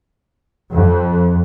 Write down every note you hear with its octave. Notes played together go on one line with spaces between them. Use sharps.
F2